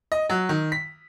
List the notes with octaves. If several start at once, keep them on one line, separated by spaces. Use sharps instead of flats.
D#5
F#3
D#3
B6